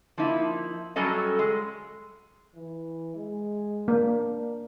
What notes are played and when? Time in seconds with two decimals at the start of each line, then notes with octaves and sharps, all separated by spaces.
0.18 F3 A#3 D#4 E4
0.96 F#2 F#3 G3 C#4 A4 D#5
1.39 G#3
2.56 E3
3.16 G#3
3.88 A#3 D4